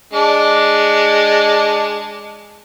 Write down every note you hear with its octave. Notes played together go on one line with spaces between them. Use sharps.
G#3 D4